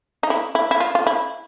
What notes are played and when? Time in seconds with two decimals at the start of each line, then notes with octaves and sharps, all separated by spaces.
0.23 D#4
0.30 E4
0.55 E4
0.71 E4
0.80 F4
0.95 F4
1.07 E4